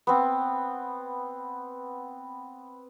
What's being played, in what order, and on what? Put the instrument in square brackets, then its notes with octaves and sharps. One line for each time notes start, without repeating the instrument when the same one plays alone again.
[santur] B3 C4